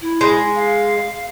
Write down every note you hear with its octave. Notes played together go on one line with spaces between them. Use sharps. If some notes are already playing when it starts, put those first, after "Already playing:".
E4
G#3
F5